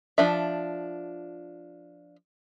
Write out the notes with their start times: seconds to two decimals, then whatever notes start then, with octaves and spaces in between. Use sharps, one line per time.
0.18 F3 D4 E5